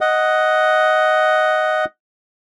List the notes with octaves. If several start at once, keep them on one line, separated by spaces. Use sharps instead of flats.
D#5 F#5